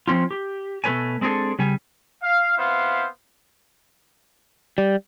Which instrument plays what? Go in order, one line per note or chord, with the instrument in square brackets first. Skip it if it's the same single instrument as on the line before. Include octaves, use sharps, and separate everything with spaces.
[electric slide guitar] F3 C4 C#4 F4
G4
B2 A3 G4 B4 C#5 G#5
G#3 C4 D4 F4 G#4 A4
C#3 G3 G#5
[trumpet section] F5
B3 C4 E4 C5 F5
[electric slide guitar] G3